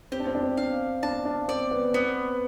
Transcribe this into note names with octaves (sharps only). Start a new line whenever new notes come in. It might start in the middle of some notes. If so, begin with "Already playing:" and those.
C4 G4
D4
C4
D4
C4
D4 F5
D4 A5
D4
C4 D5
B3
B3 C4